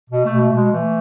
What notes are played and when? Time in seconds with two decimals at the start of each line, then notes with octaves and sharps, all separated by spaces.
0.10 B2
0.25 A3
0.31 B2
0.40 A3
0.51 B2 G#3
0.71 E3 A3